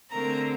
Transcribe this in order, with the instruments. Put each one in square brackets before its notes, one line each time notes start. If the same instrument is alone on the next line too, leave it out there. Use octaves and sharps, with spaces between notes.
[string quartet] D3 A3 C4 A#4 A#5